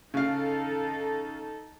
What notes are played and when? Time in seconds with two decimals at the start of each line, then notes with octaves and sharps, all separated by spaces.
0.14 C#3 D#4 A4 F5